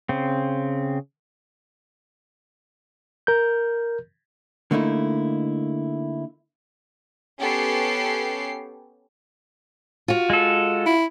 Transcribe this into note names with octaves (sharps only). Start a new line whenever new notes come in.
C#3 C4
A#4 G6
D3 A3 A#3 D#4 E4
B3 C#4 G4 A4 C7
F4 F#4
G#3 A4
E4